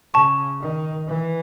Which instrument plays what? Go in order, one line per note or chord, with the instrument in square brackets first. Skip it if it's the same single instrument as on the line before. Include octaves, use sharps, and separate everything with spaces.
[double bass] C#3 [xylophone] A5 C#6
[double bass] D#3
E3